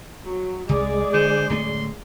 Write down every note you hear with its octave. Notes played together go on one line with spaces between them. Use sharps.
F#3
C2 G#3 G#4 D5
D3 C5
D1 A3 C#4 C6